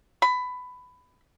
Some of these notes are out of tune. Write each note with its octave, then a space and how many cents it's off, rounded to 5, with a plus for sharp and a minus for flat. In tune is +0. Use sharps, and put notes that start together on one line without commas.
B5 +15